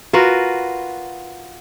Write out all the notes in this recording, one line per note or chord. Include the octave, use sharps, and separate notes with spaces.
F4 F#4 A#4 B4